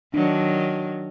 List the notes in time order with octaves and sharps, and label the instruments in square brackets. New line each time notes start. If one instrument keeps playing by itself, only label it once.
[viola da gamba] D#3 F#3 [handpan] D4